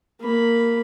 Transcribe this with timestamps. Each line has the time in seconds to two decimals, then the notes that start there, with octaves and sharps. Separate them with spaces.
0.20 A#3 B5